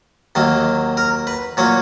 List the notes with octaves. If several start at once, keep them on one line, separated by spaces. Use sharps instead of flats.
D#2 D#3 F#3 A#3
A#4
B4
A#2 F#3 A#3 C#5